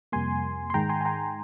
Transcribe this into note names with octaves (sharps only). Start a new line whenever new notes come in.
F2 C3 G3 A#3 G#5 C6
C6
G#2 D#3 G#3 G5 A#5
G#5 C6
G#5
G5 A#5